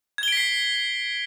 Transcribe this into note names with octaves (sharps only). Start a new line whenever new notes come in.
G#6 B6 C7 D7 G7